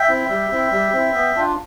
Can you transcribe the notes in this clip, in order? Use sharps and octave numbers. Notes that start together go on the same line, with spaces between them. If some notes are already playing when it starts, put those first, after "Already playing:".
Already playing: E5 G5
C4 E4
G3
C4 E4
G3
C4 E4
B3
D4 F4